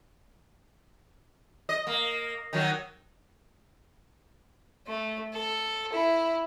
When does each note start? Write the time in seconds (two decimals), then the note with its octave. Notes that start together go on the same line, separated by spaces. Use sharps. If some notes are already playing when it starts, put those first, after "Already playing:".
1.69 D#5
1.87 A#3
2.53 D#3 F#3
4.87 A3
5.33 A4
5.92 E4